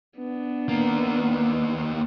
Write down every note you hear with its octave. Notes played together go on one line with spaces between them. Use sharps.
B3 D4
D#2 A#3